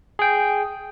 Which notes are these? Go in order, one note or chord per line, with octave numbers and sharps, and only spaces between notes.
G#4 G5